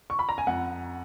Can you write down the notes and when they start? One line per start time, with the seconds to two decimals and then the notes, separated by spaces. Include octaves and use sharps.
0.10 C#6
0.19 B5
0.29 A#5
0.38 G#5
0.47 F2 F#5